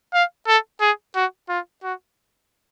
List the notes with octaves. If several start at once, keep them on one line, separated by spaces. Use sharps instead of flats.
F5
A4
G#4
F#4
F4
F#4